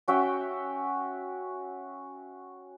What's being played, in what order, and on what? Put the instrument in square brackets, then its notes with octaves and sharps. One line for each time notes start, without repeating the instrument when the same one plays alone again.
[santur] C#4 F#4 E5 G5